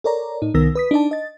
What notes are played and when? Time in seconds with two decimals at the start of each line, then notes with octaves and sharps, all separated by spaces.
0.04 A4 A#4 C#5 D5 A#5
0.42 A2 D#4
0.54 C2 D#3 B3 A#4 E6 A#6
0.75 B4 D#6 B6
0.91 D4 D#4 D5 A5
1.11 D#5 A6